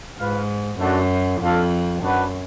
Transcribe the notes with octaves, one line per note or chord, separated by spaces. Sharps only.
G#2 F4 B4 F5
F#2 A3 D4 F#4
F2 D4 F4 A4 F5
F#2 D4 F#4 B4 F#5